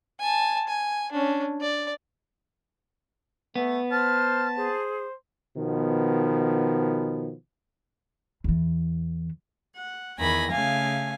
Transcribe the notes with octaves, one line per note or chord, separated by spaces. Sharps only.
G#5 A5
G#5
C#4 D4
D5
A3 B3
C5 A5 F6
G#4 C5
B2 D#3 F3 B3
E2 E3
F#5
E2 D#3 G#5 B5 A#6
C#3 A3 F5 G#5